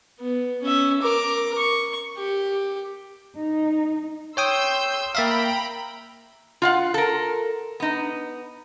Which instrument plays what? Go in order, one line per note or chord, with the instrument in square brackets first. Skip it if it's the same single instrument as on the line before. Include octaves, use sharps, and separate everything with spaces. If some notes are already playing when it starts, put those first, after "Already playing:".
[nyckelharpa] B3
C#4 E5
A#4 D6
C#6
G4
[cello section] D#4
[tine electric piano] C#5 G5 D#6 [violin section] C6 E6 G6
[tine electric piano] A#3 E5 F5 [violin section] G5 A#5 B5
[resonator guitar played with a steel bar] F4 F5 F#5
A4 A#4
B3 D#4